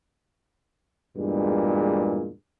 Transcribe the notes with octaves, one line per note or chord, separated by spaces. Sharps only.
E2 G2 A#2 G#3